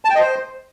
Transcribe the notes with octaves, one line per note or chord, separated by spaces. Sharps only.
A5
G5
D#5
C5